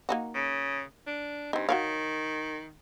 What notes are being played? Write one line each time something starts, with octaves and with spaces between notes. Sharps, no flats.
A#3 D#4 F#4
C#3
D4
G2 C4 D#4
D#3 F#4 C#5 F5